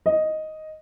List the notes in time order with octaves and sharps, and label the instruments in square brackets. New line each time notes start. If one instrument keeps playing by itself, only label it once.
[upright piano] D#5